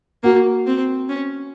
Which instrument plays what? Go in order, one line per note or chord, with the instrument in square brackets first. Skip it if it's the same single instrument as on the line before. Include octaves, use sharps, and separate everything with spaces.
[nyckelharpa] A#3 [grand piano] F#4
[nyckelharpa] C4
C#4